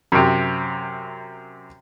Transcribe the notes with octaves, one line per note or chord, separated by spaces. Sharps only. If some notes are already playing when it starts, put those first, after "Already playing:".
F#2 C3